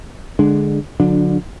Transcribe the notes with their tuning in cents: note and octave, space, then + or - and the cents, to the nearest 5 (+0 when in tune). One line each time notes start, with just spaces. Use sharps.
D3 +0 G#3 +0 D4 +10
D3 -15 F#3 -35 D4 +15